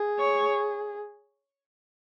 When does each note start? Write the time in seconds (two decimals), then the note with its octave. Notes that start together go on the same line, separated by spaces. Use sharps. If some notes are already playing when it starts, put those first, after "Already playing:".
Already playing: G#4
0.19 C#5